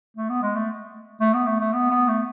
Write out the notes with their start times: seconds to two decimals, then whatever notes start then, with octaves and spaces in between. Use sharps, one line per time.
0.17 A3
0.29 B3
0.42 G#3
0.55 A3
1.20 A3
1.33 B3
1.46 A3
1.60 A3
1.73 B3
1.90 B3
2.08 A3